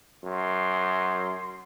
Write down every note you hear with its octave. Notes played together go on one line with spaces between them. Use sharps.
F#2 C6